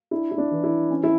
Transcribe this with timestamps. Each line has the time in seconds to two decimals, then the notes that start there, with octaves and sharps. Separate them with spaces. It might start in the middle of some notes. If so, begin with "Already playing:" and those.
0.11 D4 E4
0.31 E4
0.38 D4
0.51 E3
0.64 E4
0.91 C#4
1.03 E4